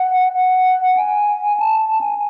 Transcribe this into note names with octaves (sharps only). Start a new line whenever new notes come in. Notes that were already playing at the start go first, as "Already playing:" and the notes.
Already playing: F#5
F#5
G#5
A5
A5
G#5